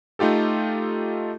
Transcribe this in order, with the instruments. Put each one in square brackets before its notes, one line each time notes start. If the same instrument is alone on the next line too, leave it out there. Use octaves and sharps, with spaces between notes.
[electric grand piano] A3 D#4 F4 G4 A4